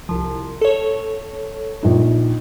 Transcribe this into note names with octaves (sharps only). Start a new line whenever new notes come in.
C2 F3
A4 C#5
A#1 D#4